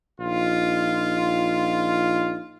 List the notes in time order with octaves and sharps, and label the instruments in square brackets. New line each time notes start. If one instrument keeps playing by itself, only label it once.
[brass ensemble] A#1 D#4 F4